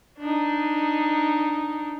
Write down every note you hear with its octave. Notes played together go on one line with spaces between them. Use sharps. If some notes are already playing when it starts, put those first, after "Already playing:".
D4 D#4